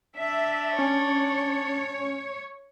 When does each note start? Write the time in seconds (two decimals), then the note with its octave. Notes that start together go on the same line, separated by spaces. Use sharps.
0.18 D4 E5
0.79 C#4 C#5